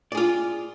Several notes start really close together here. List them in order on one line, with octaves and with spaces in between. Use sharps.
D5 G#4 F4